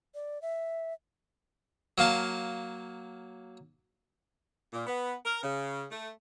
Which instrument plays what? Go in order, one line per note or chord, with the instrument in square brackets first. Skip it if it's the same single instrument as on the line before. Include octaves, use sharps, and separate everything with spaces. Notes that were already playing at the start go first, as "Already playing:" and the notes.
[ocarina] D5
E5
[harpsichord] F#3 A#3 F5 A5
[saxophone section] A#2
B3
A#4
C#3
A3